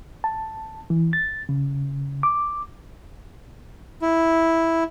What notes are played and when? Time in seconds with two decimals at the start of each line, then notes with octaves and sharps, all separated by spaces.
0.24 A5
0.90 E3
1.13 A6
1.49 C#3
2.23 D6
4.02 E4